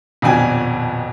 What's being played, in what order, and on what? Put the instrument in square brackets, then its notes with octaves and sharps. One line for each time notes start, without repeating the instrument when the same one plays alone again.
[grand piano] D#1 F2 B2 D4 G5 G#5